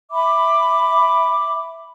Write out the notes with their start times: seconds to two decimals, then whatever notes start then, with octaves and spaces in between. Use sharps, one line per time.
0.11 E5 B5 D6